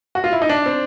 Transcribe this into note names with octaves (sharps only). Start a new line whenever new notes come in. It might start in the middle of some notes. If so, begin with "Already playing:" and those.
F#4
F4
E4
D#4
D4
C4